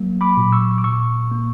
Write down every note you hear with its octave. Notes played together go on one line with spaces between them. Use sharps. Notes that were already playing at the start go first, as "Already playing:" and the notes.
Already playing: F#3 A#3
B5 D6
A#2
C#6 E6
D6
A#2 C#6 E6
A#3